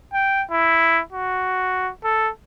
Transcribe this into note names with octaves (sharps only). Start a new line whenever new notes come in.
G5
E4
F#4
A4